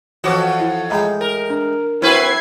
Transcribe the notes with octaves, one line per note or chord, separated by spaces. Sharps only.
F2 E3 F#4 C5 C#5 D#5 D6
E4
A2 G#3 D#5 G5 A#5 B5
A#4
D4
F#3 C4 E4 F#4 B4 C6 G#6 C7